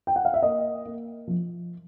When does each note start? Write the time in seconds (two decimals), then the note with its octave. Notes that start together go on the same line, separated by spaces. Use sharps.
0.07 G5
0.16 F#5
0.25 F5
0.34 E5
0.42 A#3 D#5
0.85 A#3
1.27 F3